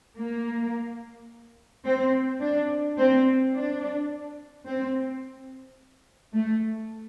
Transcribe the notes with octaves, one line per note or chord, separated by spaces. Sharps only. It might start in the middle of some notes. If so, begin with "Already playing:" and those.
A#3
C4
D4
C4
D4
C4
A3